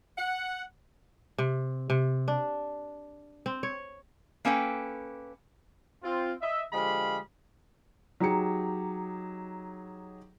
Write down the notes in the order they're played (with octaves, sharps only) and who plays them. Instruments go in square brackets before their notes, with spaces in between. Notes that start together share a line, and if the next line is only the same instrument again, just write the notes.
[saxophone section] F#5
[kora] C3
C3
D4
C4
C#5
[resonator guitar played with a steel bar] A#3 C#4 A4 B4 D5 G5
[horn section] C4 F4
D#5 E5
D3 F3 G#3 G4 F5 B5
[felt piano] F#3 D#4 G4 G#4 A#5 C#7